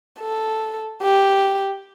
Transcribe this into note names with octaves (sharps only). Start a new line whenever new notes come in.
A4
G4